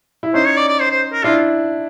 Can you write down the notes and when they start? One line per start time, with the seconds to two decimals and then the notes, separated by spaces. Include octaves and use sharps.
0.23 E4
0.34 C#4 D#4 C5
0.46 C#5
0.57 D5
0.68 D5
0.79 C5
0.90 C5
1.13 A#4
1.24 D4 E4 F4